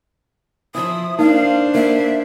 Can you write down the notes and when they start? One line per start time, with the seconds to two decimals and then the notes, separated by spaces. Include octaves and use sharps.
0.75 F3 E4 D#6
1.19 A#3 D4 D#4 C5 F5
1.75 A#3 E5